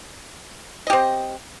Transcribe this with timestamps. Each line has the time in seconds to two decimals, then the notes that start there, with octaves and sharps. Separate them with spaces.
0.87 D#5
0.90 G4
0.93 C4